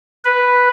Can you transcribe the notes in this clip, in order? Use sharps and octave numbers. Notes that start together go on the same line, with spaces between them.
B4